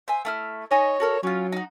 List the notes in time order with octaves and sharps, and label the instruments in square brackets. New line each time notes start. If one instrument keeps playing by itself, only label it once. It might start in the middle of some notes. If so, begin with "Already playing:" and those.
[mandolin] C5 E5 G#5
A3 E4 F6
[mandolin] D#4 D#5 G#5 [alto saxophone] C#5
[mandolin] F#4 A4 A#4
[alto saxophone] F#3 [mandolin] C#4 F4
[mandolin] D#4 F#4